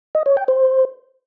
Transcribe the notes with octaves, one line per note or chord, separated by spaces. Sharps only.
D#5
C#5
G5
C5